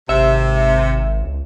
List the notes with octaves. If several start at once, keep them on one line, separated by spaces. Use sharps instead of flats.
G#1 C3 E5
C#2